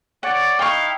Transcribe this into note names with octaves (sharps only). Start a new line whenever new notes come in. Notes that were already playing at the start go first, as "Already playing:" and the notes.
C#5 D5 F#5
D#4 E4 F5 G5 C#6